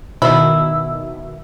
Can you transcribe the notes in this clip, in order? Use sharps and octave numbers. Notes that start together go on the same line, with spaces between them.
B2 D#3 E4